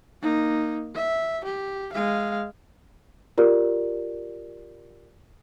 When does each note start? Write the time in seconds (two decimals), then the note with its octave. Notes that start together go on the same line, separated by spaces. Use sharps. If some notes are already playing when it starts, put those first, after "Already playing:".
0.22 A#3 D#4
0.95 E5
1.45 G4
1.93 G#3 F5
3.38 F4 G4 A#4 D5